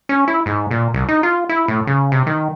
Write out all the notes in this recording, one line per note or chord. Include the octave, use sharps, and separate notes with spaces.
C#4
E4
G#2
A#2
C2
D#4
F4
E4
A2
C#3
C3
D#3